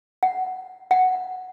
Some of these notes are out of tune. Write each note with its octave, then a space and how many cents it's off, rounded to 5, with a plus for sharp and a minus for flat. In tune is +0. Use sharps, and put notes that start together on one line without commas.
F#5 +10
F#5 +0